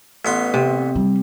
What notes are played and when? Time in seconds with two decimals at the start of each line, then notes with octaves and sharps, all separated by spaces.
0.25 A1 B3 C6
0.54 C3
0.95 G3